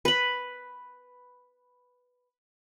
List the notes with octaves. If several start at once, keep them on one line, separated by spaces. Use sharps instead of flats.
B4 B5